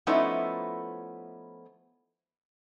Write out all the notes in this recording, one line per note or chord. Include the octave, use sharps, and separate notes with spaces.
F3 A3 B3 C#4 D#4 E4